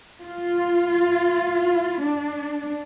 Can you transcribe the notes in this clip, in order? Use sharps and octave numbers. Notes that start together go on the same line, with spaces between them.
F4
D4